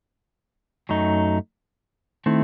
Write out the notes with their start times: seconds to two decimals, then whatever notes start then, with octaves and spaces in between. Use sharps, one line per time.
0.89 F#2 F#3 A3 D#4
2.26 D#3 A3 C4 E4